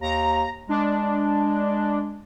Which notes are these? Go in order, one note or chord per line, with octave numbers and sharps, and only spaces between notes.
D#2 A#5
G#3 D4